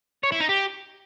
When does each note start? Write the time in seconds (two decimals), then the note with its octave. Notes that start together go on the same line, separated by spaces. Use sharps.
0.24 C#5
0.32 E4
0.40 D#4
0.49 G4